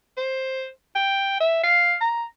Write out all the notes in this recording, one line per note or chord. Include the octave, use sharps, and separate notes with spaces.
C5
G5
E5
F5
A#5